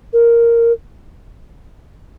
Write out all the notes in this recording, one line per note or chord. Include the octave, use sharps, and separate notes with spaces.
A#4